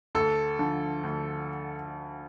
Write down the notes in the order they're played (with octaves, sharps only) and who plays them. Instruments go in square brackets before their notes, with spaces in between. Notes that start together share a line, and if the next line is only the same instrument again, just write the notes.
[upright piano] D2 [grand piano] A4
[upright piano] D3 F3
D2